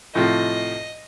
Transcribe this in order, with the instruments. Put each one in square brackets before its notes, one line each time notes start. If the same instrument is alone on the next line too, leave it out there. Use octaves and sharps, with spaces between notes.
[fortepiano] A2 C3 F3 [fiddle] D#5